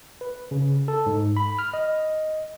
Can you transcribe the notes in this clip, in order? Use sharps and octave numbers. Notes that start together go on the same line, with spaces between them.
B4
C#3
A4
G#2
B5
F6
D#5